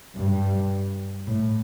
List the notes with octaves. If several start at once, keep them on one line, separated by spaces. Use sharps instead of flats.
G2
A2